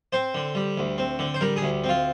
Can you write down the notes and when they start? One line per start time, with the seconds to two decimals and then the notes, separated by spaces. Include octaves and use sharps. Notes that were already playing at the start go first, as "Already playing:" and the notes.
0.13 C4 C5
0.35 D3
0.55 G3
0.77 D2
0.98 C4
1.19 D3
1.34 C5
1.41 G3 A#4
1.56 G#4
1.62 D2
1.84 C4
1.89 F4